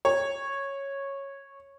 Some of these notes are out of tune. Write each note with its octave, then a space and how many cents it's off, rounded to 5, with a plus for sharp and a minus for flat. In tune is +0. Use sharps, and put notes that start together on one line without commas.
C#5 -10